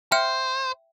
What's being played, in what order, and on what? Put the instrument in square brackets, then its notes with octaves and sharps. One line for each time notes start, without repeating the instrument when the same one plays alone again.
[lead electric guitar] C5 [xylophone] E5 G5 F6